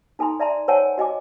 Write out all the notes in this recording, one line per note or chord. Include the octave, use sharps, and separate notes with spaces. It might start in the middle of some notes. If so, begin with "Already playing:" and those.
D#4 A4 G#5 A#5 C6
D5 E5 A5 A#5 C6
A#4 C5 C#5 F#5 G#5 A5
F#4 D#5 G#5 D6